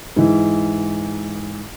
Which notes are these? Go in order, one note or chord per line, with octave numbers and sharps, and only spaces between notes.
G#2 E3